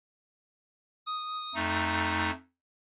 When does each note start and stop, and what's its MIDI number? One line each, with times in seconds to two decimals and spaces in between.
1.06 1.54 87
1.55 2.31 41
1.55 2.31 57
1.55 2.31 63